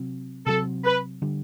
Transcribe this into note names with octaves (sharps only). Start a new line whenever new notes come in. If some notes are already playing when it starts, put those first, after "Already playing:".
Already playing: C3 F#3 C4
C3 F#3 C4 A4
B4
D3 G3